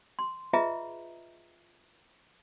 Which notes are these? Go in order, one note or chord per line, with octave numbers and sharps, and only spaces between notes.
C6
F4 G#4 B4 D#5 E5 A#5